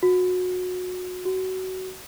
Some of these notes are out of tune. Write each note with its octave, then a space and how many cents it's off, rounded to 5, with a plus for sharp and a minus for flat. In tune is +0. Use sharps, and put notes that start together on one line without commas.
F#4 -25
F#4 +20